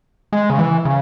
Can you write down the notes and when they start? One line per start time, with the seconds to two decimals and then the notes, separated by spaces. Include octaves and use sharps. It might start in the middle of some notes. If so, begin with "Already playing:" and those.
0.33 G#3
0.50 C#3
0.59 E3
0.85 C#3